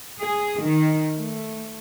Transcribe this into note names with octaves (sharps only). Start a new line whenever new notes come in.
G#4
D#3
A3